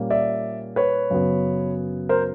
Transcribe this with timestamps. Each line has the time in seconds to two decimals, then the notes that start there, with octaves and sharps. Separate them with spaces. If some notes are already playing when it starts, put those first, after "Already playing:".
Already playing: A#2 G3 A#3 C#4
0.10 D5 E5
0.76 B4 C#5
1.10 F#2 C#3 F#3 B3
2.09 A#4 C5